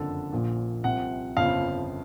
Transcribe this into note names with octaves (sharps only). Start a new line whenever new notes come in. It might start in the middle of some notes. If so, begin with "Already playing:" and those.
Already playing: F#1 F2 D3 A4
A#1 A#2 F3
C2 C3 F3 F#5
G1 F2 C#3 F3 F5